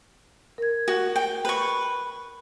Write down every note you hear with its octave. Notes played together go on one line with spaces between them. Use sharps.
A#4 G#6
F#4
G5
B4 C#6